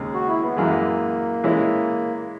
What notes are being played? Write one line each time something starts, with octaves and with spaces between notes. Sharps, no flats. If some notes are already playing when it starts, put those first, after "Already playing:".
Already playing: D#2 C#3 G#3
F#4
E4
B3
F#2 E3 G#3 A#3
E3 G#3 C#4 E4